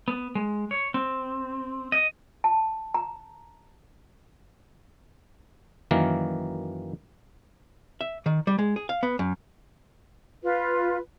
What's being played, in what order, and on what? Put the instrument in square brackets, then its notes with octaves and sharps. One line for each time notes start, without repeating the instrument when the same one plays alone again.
[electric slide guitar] B3
G#3
C#5
C4
D#5
[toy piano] A5
A#5
[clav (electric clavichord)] F#2 D#3 E3 A#3
[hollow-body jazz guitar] E5
D#3
G3
G#3
G#4
F5
B3
F#2
[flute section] F4 B4